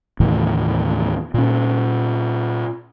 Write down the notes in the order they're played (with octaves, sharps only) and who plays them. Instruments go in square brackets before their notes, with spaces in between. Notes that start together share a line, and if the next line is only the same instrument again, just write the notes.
[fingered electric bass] D#2 A2 C#3 E3
A#2 C#4